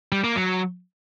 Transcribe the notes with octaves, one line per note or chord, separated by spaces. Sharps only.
G3
A#3
F#3